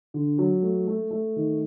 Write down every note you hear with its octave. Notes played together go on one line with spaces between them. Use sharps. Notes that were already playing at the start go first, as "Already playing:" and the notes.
D3
F#3
A3
A3
A3
D#3